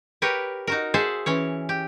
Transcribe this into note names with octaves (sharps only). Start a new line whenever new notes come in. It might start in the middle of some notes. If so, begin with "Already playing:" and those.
G4 A#4 B4 C#5
D#4 F#4 A#4
G#4 C5 E5 F#5 G#5 A5
E3 C#4 C#5
G4